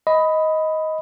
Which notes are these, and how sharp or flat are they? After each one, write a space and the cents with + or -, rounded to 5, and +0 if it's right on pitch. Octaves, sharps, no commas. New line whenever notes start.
D#5 +15 B5 +10